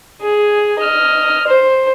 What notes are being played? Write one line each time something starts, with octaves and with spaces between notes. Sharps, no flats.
G#4
D#5 F6
C5